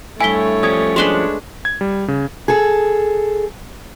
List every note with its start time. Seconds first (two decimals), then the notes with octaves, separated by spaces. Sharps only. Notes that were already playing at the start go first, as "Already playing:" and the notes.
0.21 G2 A3 E4 C#5 G#5 B6 G7
0.63 F3 G3 C#4 D#6 G#6
0.96 G#3 D4 B4 C6 E7 G7
1.65 G#6
1.81 G3
2.08 C#3
2.48 G#4 A4